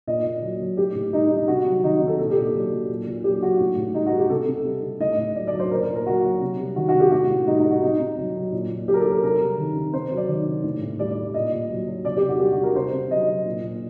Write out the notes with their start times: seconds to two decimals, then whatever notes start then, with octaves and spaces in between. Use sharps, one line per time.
0.07 A#2 D#5
0.25 A#2
0.42 F#3
0.61 F#3
0.77 A2 G4
0.95 A2
1.13 G3 D#4
1.31 G3
1.36 D#4
1.48 C3 F#4
1.66 F#3
1.83 D#3 D#4
1.95 F#4
2.02 C3
2.07 A4
2.19 A#2 A4
2.31 G4
2.36 A#2
2.54 F#3
2.72 F#3
2.89 A#2
3.07 A#2
3.24 F#3 G4
3.42 F#3 F#4
3.60 A2
3.77 A2
3.94 G3 D#4
4.06 F#4
4.13 G3
4.18 G4
4.30 C3 A4
4.48 C3
4.65 G3
4.83 G3
5.00 A2 D#5
5.18 A2
5.35 F#3 D5
5.47 D5
5.54 F#3
5.60 C5
5.71 A#2 A#4
5.83 A#4
5.89 A#2
5.95 A#4
6.06 F#3 F#4
6.23 F#3
6.41 C3
6.59 G3
6.76 D#3 F#4
6.89 F#4
6.94 C3
7.00 G4
7.12 A2 F#4
7.30 A2
7.47 G3 D#4
7.58 D#4
7.65 G3
7.71 F#4
7.83 C3 D#4
8.00 C3
8.17 F#3
8.36 F#3
8.52 A#2
8.71 A#2
8.88 F#3 G4
8.94 A#4
8.99 A4
9.06 F#3
9.11 A#4
9.23 C3 A#4
9.41 G3
9.58 D#3
9.75 C3
9.93 C3 C5
10.11 F#3
10.17 D5
10.28 D#3
10.47 C3
10.64 A2
10.82 A2
10.99 G3 D5
11.17 G3
11.34 A#2 D#5
11.52 A#2
11.70 F#3
11.87 F#3
12.05 C3 D5
12.17 G4
12.23 C3
12.29 F#4
12.40 G3 G4
12.52 F#4
12.58 G3
12.63 A#4
12.76 C3 C5
12.93 C3
13.10 F#3 D#5
13.29 F#3
13.46 A#2
13.63 A#2